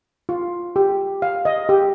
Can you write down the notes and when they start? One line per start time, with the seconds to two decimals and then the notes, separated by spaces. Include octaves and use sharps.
0.29 F4
0.76 G4
1.22 F5
1.45 D#5
1.69 G4